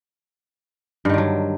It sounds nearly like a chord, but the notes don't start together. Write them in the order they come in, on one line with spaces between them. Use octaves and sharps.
G2 D#3 D3 F#3